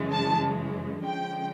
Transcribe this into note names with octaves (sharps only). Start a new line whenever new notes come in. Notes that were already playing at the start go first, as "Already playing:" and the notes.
Already playing: F#2 C#3 E3 G#3
A5
D3 F3 G#3 C#4 G5